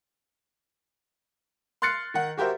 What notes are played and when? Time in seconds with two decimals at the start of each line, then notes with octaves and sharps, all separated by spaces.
1.82 C6 F6 F#6 A6 C7 C#7
2.14 D#3 F#5
2.37 F#4 G4 A#4 C5 E5